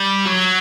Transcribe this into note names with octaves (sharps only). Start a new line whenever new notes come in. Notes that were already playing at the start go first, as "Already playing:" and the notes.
Already playing: G3
F#3